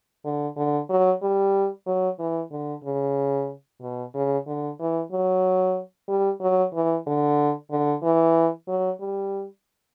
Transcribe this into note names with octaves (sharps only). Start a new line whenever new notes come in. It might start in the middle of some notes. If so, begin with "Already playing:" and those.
D3
D3
F#3
G3
F#3
E3
D3
C#3
B2
C#3
D3
E3
F#3
G3
F#3
E3
D3
D3
E3
F#3
G3